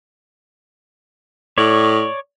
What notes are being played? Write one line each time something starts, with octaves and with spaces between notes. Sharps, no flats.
A2 C#5 D5